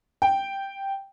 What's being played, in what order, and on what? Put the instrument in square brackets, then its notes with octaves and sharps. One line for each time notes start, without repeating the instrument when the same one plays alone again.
[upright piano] G5